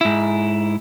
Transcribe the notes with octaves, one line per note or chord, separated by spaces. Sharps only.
G#2 E4